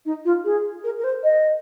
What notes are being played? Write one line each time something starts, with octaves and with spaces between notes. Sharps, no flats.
D#4
F4
G#4
A#4
A#4
C5
D#5